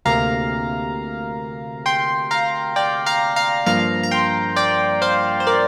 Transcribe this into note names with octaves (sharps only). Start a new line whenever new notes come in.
D2 C3 A#3 F5 A#5
G5 C6
F5 A#5
D5 G5
F5 A#5
F5 A#5
G2 F3 A#3 F5 A#5
A#5
G5 C6
D5 G5
C5 F5
C5
A#4 D5